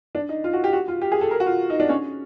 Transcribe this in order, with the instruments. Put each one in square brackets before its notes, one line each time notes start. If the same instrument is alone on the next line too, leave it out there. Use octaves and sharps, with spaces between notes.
[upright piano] D4
D#4
F4
F#4
G4
F#4
F4
G4
G#4
A4
A#4
F#4
F4
D#4
D4
C#4